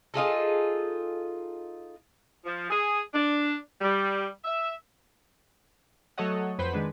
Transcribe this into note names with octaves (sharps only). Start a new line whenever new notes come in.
D#4 F4 G#4 A4
F3
G#4
D4
G3
E5
F#3 A3 A4 C#5 D#5 F#5
F2 B4 C5 F#5 B5 B6
D#3 G#3 D4 B4